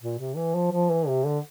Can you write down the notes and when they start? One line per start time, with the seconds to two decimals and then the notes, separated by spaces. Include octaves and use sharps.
0.01 A#2
0.19 C3
0.37 E3
0.55 F3
0.72 F3
0.91 E3
1.08 C3
1.26 D3